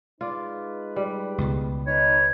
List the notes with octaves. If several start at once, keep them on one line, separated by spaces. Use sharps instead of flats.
G#3 D#4 F4 B4 D5
G3
C#2 B2
D#4 B4 C#5